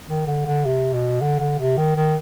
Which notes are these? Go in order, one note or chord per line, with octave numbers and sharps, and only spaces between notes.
D#3
D3
D3
C3
B2
D3
D3
C3
D#3
D#3